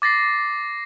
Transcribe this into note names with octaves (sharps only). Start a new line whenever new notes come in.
D6 A6 A#6 C7